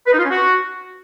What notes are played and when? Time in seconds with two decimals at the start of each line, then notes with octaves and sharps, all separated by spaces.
0.07 B4
0.13 D#4
0.18 F4
0.24 C#4
0.30 F#4